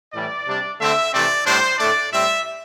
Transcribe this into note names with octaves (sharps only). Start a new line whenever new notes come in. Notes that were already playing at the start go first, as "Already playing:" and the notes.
A2 E3 G3 D5
C3 G3 D4
D3 A3 C4 E5
C3 E3 A3 C4 D5
A2 G3 D4 C5
A2 A3 D4 D5
A2 G3 C4 E5